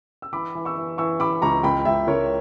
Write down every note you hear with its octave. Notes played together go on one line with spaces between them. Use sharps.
E6
E3 B5 D6
E3
C#6 E6
E3
E3 C#6 E6
E3 B5 D6
C#2 A#5 C#6
C#2 G5 B5
C#2 E5 G5
C#2 A#4 C#5